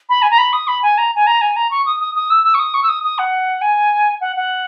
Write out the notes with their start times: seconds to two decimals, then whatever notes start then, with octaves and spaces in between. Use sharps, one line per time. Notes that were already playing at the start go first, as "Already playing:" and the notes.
0.09 B5
0.22 G#5
0.30 A#5
0.38 B5
0.53 D#6
0.67 B5
0.82 G#5
0.98 A#5
1.15 G#5
1.27 A#5
1.41 G#5
1.56 A#5
1.71 C#6
1.86 D#6
2.00 D#6
2.15 D#6
2.30 E6
2.44 E6
2.54 C#6
2.59 D#6
2.74 C#6
2.83 E6
2.89 D#6
3.03 D#6
3.18 F#5
3.61 G#5
4.21 F#5
4.36 F#5